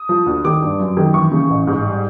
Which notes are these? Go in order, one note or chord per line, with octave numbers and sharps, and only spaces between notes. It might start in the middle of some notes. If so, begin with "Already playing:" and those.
Already playing: D#6
F3
D2
D#3 D6
G2
F#2
D#3
E3 C#6
C#3
A1
G#2
G3